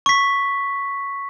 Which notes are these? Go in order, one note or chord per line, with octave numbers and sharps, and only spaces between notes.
C#6 B6